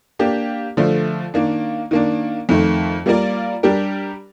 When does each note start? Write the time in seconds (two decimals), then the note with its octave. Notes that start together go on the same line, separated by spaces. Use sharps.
0.19 A#3 D4 G4
0.77 D3 F3 A3
1.34 D#3 A#3 D4
1.91 D#3 A#3 D4
2.49 F2 D#3 A3
3.06 G3 A#3 F4 A#4 D5
3.63 G3 D4 G4 A#4